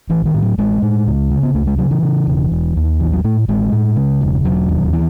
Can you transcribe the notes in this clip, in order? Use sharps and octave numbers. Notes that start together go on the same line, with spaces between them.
A1 E3
D#3
A2
F#3
A1 G#3
A2
C#2
C#3
B3
C#2 A3
G#3
C#3 F#3
E3
C#3
E1
E1
D#2
A1 E3
F#3
A2 A3
A1 G#3
A2
C#3
E1
E1 F#3
D#2
E3